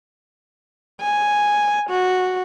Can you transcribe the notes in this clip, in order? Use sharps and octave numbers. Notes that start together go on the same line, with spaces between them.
G#5
F#4